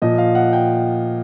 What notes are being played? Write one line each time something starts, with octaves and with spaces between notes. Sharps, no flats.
A#2 F3 D#5
F5
F#5
G5